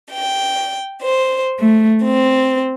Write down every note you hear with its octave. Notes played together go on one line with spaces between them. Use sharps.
G5
C5
A3
C4